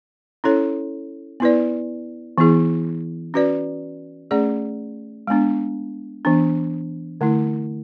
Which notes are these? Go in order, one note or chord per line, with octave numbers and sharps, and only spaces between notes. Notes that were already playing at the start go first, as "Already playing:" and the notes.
C#4 E4 A4 C#5
B3 E4 B4 D5
E3 B3 E4 G#4
C#4 F#4 B4 D5
A3 C#4 G#4 D5
G#3 B3 D4
E3 B3 D4
D3 A3 E4